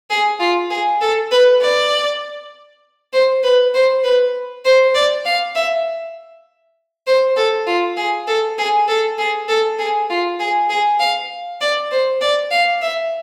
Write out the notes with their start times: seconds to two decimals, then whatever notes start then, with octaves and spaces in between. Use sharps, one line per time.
0.10 G#4
0.40 F4
0.70 G#4
1.01 A4
1.32 B4
1.61 D5
3.13 C5
3.44 B4
3.74 C5
4.04 B4
4.65 C5
4.95 D5
5.25 F5
5.56 E5
7.07 C5
7.37 A4
7.67 F4
7.97 G#4
8.27 A4
8.58 G#4
8.88 A4
9.18 G#4
9.48 A4
9.79 G#4
10.10 F4
10.40 G#4
10.70 G#4
11.00 F5
11.61 D5
11.91 C5
12.21 D5
12.51 F5
12.82 E5